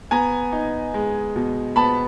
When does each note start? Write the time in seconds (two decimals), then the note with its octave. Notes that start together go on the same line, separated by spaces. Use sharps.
0.11 B3 G#5 A#5
0.52 D#4
0.94 G#3
1.36 B2
1.76 B3 A5 B5